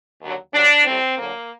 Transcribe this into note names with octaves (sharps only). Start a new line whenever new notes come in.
D#2 D3 F#3
G2 F#3 D4
A2 G3 C4
D2 D3 F#3 A#3